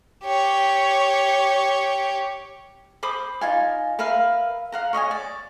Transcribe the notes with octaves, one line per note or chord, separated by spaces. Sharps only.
G4 C#5
C5 B5 D6 D#6
D#4 F4 G#5
A#4 B4 E5 F5
F5 F#5 A#5
C#5 D#5 E5 G#5
D5